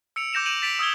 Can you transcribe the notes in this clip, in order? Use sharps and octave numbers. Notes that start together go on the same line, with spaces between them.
E6 C#7 D7 F7
D6 G6 A#6 E7 F7
G6 D7 D#7 F7 F#7
A6 B6 D7 F7
D#6 E6 G#6 G7